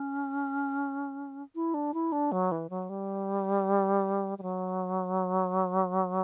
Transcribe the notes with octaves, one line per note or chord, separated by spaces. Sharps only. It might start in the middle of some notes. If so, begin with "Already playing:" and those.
Already playing: C#4
E4
D4
E4
D4
F#3
E3
F#3
G3
G3
F#3